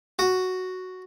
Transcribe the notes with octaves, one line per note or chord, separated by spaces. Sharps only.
F#4